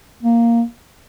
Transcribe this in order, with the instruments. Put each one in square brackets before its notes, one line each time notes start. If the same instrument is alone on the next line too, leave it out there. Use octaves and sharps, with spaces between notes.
[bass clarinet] A#3